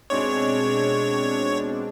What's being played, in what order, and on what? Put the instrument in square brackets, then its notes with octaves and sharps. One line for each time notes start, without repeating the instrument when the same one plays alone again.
[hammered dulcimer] G#2 G#3 D6 [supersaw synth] B2 C4 D4 [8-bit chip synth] C#5